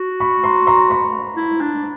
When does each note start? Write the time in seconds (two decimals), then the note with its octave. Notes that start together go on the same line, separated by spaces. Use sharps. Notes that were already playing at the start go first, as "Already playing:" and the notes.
Already playing: F#4
0.20 B5 C#6
0.44 A#5 C6
0.67 A#5 C6
0.90 B5 C#6
1.37 E4
1.61 D4